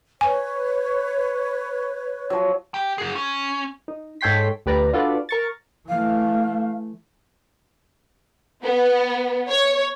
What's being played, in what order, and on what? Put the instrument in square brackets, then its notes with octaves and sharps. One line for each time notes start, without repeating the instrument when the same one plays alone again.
[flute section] B4 C#5 [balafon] G#5
[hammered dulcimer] F3 F#3
[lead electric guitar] G4 G5
F#4 G#4
C#4
[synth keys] D#4
G#2 A4 C#5 G5 C6 B6
D2 G4 B4 D5 A#5
D4 F4 F#4 A4 B4 D5
A#4 C#6 A6
[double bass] E3 A3 [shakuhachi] F5
[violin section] B3
C#5